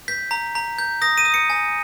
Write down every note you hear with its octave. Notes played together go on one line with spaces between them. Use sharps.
G6 B6
A#5
A#5
G6
D#6 A#6
D#7
D#6
C#7
G#5